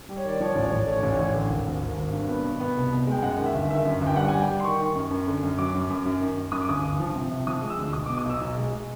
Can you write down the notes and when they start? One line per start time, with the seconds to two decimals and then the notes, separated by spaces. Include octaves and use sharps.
0.09 G3
0.17 C#5
0.25 D#3 D5
0.40 F3 C#5
0.53 A1 D5
0.64 C#5
0.71 A1
0.77 D5
0.87 A3 C#5
1.00 A1 D5
1.12 C#5
1.19 A1
1.34 D3
1.50 G#1
1.66 G#1
1.81 G#1
1.98 G#1
2.12 G2
2.28 B3
2.44 B2
2.60 B3
2.75 C2
2.92 B2
3.07 G#3 G5
3.22 F#2 F#5
3.38 D#3
3.46 E5
3.54 G1
3.70 D#3 E5
3.85 F#2
4.01 G1
4.06 G5
4.16 G3 F#5
4.28 G3 G#5
4.41 G5
4.49 G3
4.60 C6
4.64 D#3 C#6
4.79 D#3
4.95 F#2
5.11 F#2
5.27 D3
5.43 F#2
5.58 F#3 D6
5.74 F#2
5.90 F#2
6.06 F#2
6.20 D#3
6.37 F#2
6.52 F#2 D#6
6.61 D6
6.68 G1 D#6
6.83 G1
7.00 F3
7.15 C3
7.31 C3
7.47 F3 D#6
7.62 G#3
7.70 E6
7.78 D2
7.93 B1 D#6
8.06 D6
8.10 B2
8.18 D#6
8.25 B1 E6
8.41 B1
8.57 G#3
8.72 G#3